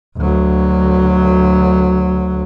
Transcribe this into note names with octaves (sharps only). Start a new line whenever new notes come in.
D2 F#3